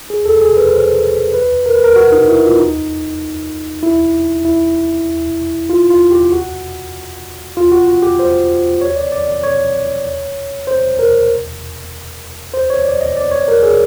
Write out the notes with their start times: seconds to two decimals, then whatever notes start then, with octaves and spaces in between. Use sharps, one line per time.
0.10 G#4
0.25 A4
0.41 G#4
0.57 B4
0.72 C5
1.34 B4
1.66 A#4
1.75 B4
1.84 A#4
1.96 F#4
2.12 D#4
2.28 E4
2.44 F4
2.59 D#4
3.83 E4
4.45 E4
5.69 F4
5.90 F4
6.11 G4
6.32 F#4
7.57 F4
7.72 F#4
7.88 F#4
8.03 G4
8.19 C5
8.81 C#5
8.96 D5
9.12 D5
9.27 D5
9.43 C#5
10.67 C5
10.99 A#4
12.54 C5
12.70 C#5
12.85 D5
13.01 D#5
13.17 D5
13.31 C#5
13.48 A#4
13.63 G#4